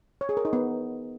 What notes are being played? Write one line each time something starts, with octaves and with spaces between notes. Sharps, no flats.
C#5
G#4
A#4
D#4
B3